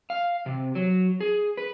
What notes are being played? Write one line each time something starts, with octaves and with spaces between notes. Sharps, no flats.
F5
C3
F#3
G#4
B4